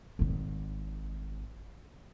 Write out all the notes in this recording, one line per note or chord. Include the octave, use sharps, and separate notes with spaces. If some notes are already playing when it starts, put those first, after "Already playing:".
G#1 D#3